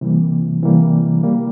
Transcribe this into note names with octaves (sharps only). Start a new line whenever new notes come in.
C3 E3 G3 A#3
C3 E3 G3 A#3
D#3 G3 A#3